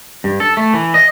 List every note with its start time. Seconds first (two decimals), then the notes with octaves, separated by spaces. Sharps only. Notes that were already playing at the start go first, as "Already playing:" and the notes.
0.24 G2
0.40 A4
0.57 A3
0.74 E3
0.94 D#5